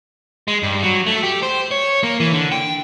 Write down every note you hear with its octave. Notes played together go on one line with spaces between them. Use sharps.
G#3
G2
F#3
A3
G4
C5
C#5
A#3
E3
D3
G5